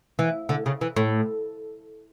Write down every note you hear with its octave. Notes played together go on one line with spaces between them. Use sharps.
E3
D3
C#3
E3
A2